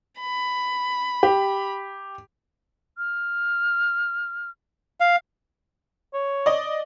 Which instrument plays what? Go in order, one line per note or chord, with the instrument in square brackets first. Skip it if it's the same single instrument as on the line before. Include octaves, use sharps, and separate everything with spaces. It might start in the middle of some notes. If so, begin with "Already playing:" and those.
[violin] B5
[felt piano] G4
[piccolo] F6
[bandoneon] F5
[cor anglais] C#5
[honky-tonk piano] D5 D#5